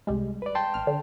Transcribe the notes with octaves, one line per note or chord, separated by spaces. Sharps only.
C2 G3 G#3
B4 D5
G5 A5 C6
A1 F6
D3